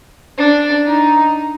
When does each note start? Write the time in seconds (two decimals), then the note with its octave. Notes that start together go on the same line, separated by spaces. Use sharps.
0.38 D4
0.86 D#4